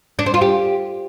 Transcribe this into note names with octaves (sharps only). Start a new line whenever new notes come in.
D4
C4
F4
G4